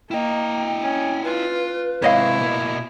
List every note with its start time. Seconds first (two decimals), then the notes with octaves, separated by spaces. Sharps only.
0.11 A#3 E4 D#5 G5
0.81 C#4
1.24 F4 B4
2.02 G#2 C3 E4 C#5 D#5 F5
2.41 B2 A#3